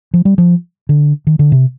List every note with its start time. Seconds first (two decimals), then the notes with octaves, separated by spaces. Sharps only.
0.14 F3
0.25 G3
0.38 F3
0.89 D3
1.27 D#3
1.39 D3
1.52 C3